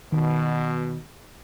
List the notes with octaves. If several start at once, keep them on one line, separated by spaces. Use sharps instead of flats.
B2 D#3